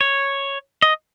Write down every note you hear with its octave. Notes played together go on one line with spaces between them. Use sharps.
C#5
D#5